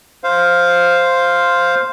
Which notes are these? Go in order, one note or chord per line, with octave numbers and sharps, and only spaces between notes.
C5 F5